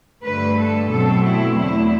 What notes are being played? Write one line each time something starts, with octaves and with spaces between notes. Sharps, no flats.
G2 D3 A3 B4
A4
B2 F#3 A3 C4 A4
E4
E2 D3 F#3 A3 E4